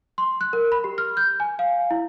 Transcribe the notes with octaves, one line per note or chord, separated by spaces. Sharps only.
C6
F#6
A#4
B5
G4
F6
G6
G#5
F5
E4